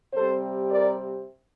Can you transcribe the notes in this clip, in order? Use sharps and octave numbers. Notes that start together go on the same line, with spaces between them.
C3 G3 C4 A4 C5
A#4 D5